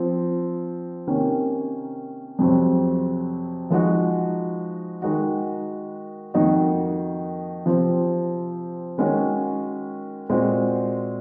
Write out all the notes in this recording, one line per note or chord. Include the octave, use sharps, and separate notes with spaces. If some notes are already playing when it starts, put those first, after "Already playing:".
Already playing: F3 C4 F4
C3 D#3 A#3 C#4
F2 C3 F#3 C4
F3 G#3 D#4 F#4
D#3 G#3 D#4 F#4
F2 D#3 A#3 D#4 F#4
C3 F3 C4
D#3 G#3 C#4 F#4
A#2 G#3 C4 F#4